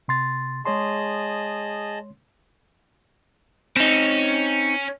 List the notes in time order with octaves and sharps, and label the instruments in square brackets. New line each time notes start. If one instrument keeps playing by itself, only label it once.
[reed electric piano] C3 C6 A6
[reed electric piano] G#3 C#5 C6 [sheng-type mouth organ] G#4 D#5 A5
[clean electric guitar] C4 D#4 [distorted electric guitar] C#4